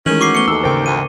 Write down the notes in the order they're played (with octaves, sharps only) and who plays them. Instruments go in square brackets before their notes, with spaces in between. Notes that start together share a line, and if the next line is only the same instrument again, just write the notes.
[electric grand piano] D#3 G#3 [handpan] E3 A3 A#4 [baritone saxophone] C#4 [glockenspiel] F#7
[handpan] F#4 [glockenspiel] C#6 D6 C7
[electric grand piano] A3 B3 [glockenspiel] C#7 G7
[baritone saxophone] D#2 [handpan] D#4 A4 [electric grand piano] E6
[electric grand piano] G#1 G5 C#6 [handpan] C#3 A#4 C5
[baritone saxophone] D2 [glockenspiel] D#7